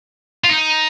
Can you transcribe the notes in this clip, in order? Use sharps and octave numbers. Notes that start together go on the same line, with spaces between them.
F4
D#4